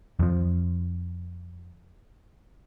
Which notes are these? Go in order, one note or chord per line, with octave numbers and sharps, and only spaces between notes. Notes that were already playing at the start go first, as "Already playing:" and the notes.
F2 F3